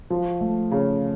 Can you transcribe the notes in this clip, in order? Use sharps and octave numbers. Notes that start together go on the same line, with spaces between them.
F3
A3
C#3